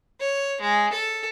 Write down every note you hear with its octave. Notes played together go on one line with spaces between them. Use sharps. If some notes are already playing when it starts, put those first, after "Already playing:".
C#5
G#3
A4